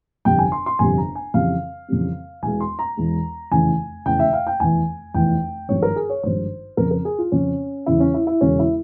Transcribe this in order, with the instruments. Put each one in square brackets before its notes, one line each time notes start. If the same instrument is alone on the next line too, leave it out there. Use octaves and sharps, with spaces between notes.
[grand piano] G1 F2 C3 G3 G5
G#5
C6
C6
G1 F2 C3 G3 G#5
A#5
G#5
F2 C#3 E3 G3 C4 F5
F2 C#3 E3 G3 C4
E1 E2 E3 G#3 G#5
C6
A#5
E1 E2 E3 G#3
F1 E2 C#3 E3 G#5
F1 E2 C#3 E3 G5
E5
F5
G5
F1 E2 E3 G#5
F1 E2 E3 G5
G#1 G2 F3 C#5
A#4
G#4
C#5
G#1 G2 F3 C5
F2 C#3 F3 C4 A#4
A#4
G#4
F4
F2 C#3 F3 C4 C#4
E1 E2 C#3 E4
C#4
E4
E4
E1 E2 C#3 C#4
E4